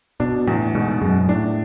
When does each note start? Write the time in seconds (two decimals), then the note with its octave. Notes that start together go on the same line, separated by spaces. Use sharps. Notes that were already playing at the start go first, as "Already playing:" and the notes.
0.20 B2 D4
0.47 E2 A2
0.75 G#2 B2
1.01 F#2 G#3
1.29 A2 D4